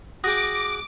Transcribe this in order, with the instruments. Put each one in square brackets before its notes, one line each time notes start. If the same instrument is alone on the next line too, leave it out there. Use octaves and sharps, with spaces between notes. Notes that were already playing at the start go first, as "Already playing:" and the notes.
[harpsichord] F#4 G#4 G5 [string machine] D6 [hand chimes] D#6 A#6